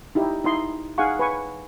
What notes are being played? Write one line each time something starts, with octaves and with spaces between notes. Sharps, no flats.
D#4 E4 G4
D#4 E4 D#5 C6
D#4 G#4 F5 F#5 G#5 C#6
B4 G#5 C#6